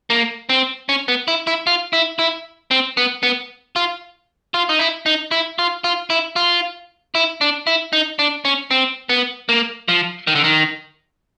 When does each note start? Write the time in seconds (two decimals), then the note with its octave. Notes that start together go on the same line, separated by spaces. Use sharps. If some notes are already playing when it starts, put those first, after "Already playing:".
0.10 A#3
0.49 C4
0.89 C#4
1.08 B3
1.28 E4
1.47 E4
1.67 F4
1.93 E4
2.19 E4
2.71 C4
2.97 B3
3.23 B3
3.76 F4
4.54 F4
4.69 D#4
4.79 E4
5.06 D#4
5.31 E4
5.59 F4
5.84 F4
6.10 E4
6.36 F4
7.15 E4
7.41 D4
7.67 E4
7.93 D#4
8.19 D4
8.45 C#4
8.71 C4
9.09 B3
9.49 A#3
9.88 F3
10.27 D#3
10.35 D3
10.44 D#3